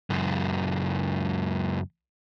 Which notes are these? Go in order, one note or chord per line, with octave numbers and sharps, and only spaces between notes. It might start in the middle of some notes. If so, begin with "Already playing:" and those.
C#2 F#2